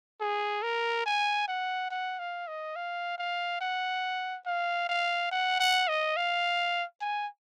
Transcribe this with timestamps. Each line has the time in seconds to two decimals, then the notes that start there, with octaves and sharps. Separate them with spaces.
0.21 G#4
0.63 A#4
1.06 G#5
1.48 F#5
1.91 F#5
2.20 F5
2.48 D#5
2.76 F5
3.18 F5
3.61 F#5
4.46 F5
4.89 F5
5.32 F#5
5.60 F#5
5.88 D#5
6.17 F5
7.01 G#5